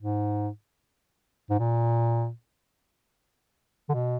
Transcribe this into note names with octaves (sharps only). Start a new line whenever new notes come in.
G#2
G#2
A#2
D3
B2